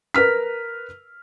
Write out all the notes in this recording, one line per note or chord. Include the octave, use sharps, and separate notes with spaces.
A#4 B4 F6 B6